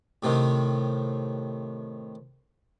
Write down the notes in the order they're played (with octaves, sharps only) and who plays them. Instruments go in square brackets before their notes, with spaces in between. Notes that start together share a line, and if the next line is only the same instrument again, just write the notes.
[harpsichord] A2 C3 D#3